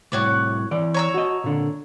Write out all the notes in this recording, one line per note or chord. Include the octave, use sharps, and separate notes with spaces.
C2 A2 F#4 C#5 D5
E3 D5
C#5 A#5 E6
F#4 D#5
A#2 D3